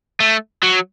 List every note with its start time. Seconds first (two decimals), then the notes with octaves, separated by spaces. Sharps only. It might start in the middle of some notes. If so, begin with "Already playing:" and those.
0.20 A3
0.63 F#3